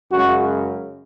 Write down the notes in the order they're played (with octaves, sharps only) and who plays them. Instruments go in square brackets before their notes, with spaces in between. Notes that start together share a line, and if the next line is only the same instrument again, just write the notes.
[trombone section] F#2 C#3 G#3 F#4